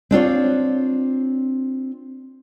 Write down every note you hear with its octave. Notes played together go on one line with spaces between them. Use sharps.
C4 D4 F4 C#5